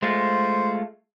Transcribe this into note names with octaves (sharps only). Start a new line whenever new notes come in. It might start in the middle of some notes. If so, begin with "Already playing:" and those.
G#3 A3 F4 C5